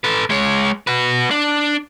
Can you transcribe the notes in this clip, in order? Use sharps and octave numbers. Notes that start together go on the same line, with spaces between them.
A4 B4
G#3 C#5
F#4 B4
D4